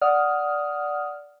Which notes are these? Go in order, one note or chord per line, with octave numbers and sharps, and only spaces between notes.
D5 F#5 D#6 F6